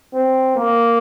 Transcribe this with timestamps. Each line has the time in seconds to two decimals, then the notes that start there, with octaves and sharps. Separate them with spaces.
0.13 C4
0.56 A#3